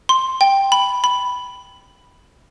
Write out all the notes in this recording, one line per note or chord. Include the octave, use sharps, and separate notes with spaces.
C6
G5
B5
B5